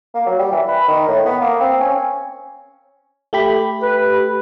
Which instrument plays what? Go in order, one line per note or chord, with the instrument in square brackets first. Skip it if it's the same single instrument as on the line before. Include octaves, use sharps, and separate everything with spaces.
[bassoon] A#3
F#3
G3
E3
B4
D#3
A2
B3
A#3
C4
C#4
[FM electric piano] A3 G4 B5
[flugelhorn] B4